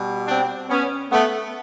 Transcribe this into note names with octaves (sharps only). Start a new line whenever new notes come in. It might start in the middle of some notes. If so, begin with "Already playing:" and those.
Already playing: B2 G3
C4 D4
B3 C#4
A3 B3